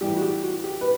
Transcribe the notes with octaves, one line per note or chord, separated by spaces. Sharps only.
A2 E3 G3 G4
F#4
G4
F#4
G4
B4